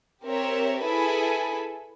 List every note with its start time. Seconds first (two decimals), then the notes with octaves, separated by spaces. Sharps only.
0.25 C4 G4 A#4 C#5 E5
0.83 E4 G#4 A4 B4 G#5 B5